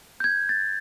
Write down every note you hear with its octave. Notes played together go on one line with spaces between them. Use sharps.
G6
G#6
A6